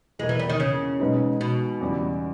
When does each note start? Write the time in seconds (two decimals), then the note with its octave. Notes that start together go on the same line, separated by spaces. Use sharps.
0.19 E2 B2 G#3 A#3
0.29 E3
0.39 G3
0.49 D#3
0.60 C#3
1.00 B2 G#3 B3 D#4
1.41 B2
1.81 E2 C#3 G3